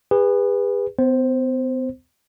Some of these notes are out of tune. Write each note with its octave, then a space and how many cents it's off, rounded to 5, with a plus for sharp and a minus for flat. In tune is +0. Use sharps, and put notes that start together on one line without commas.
G#4 -40 B4 +0
B3 +45 C5 +5